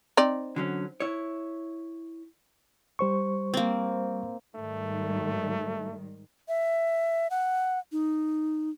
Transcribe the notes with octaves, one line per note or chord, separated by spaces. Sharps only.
C4 D#4 D5
D3 F#3 C#4
E4 C#5
G3 C5 C#6
A#3 C4
G#2 D#3 G3 A3
E5
F#5
D#4